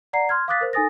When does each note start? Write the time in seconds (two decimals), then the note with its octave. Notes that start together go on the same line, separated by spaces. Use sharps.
0.13 D5 F#5 A#5 C7
0.29 C6 F6 G#6
0.48 F5 D6 D#6 F#6 A6 B6
0.61 A#4 C5
0.73 D#4 A4 G#5 D#6 A6 A#6